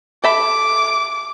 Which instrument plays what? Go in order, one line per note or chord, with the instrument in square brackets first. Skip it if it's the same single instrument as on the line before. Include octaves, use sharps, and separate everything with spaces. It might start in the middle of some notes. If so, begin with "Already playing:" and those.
[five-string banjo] A4 E5 B5 [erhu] D6